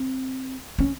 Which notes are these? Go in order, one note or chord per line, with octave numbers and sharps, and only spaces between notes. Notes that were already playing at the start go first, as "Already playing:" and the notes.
Already playing: C4
C#4